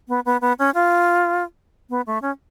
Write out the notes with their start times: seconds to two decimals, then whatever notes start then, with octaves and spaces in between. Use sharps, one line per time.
0.08 B3
0.26 B3
0.41 B3
0.59 C#4
0.74 F4
1.90 B3
2.07 A3
2.22 C#4